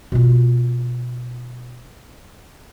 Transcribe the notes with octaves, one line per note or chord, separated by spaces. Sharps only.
B2 F4